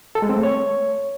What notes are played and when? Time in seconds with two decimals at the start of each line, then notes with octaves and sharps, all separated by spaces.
0.15 A4
0.22 G#3
0.29 C4
0.36 A3
0.43 C#5